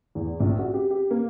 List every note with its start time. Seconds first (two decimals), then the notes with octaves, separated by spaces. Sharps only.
0.15 E2
0.40 A#1
0.59 F#4
0.74 G4
0.90 G4
1.11 A#3